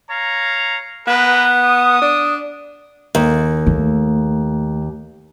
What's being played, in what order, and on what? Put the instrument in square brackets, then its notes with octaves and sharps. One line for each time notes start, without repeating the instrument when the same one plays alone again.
[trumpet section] C#5 F5 A#5
[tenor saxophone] B3 [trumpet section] G#4 A#4 B4
[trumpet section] D#6
[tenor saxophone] D4
[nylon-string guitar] D#2
[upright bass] A3